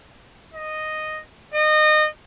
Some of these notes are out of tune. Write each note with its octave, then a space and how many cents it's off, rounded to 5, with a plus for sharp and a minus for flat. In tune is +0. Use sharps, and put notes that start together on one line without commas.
D#5 -5
D#5 -25